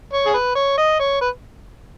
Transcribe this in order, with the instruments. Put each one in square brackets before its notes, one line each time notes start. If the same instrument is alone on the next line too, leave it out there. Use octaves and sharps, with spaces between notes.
[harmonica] C#5
G#4
B4
C#5
D#5
C#5
B4